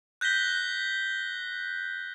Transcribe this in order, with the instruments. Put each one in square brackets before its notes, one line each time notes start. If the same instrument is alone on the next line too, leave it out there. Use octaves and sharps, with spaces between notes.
[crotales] F#6 G6 A#6 B6 G7